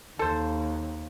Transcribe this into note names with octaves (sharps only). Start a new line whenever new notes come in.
D#2 A4 C5